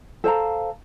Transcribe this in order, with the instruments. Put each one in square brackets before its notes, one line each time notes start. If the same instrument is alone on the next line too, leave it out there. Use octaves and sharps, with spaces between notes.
[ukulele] A4 C5 F5 A#5